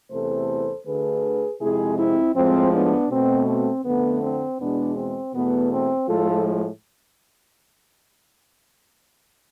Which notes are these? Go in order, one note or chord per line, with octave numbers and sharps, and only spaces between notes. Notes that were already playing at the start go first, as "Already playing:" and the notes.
E2 C3 E3 A3 A4 C5
D2 D3 A3 G#4 B4
F2 C3 G#3 E4 G#4
C4 E4
A2 F3 G#3 C4
B3 D4
B2 A3 C4
C4
F2 D3 A3 B3
C4
E2 B2 G#3 B3 D4
C4
E2 B2 A3 B3
C4
A2 F3 G#3 F4 A4